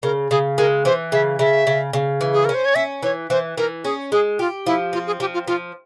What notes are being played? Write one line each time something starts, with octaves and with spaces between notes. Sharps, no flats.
C#3 A#4
C#3 G#4
G#3 A#4
E3 C5
C#3 E5
C#3 E5
C#3
C#3
E3
G#4
C#4 A#4
C5
C#5
C#4 E5
E3 C#5
E3 C5
E3 A#4
C#4 G#4
G#3 G#4
F4 G4
F3 E4
C4 F4
G#4
F3 G4
F4
F3 F4